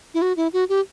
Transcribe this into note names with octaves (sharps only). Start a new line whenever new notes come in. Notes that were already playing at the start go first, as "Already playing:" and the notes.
E4
F#4
E4
F#4
G4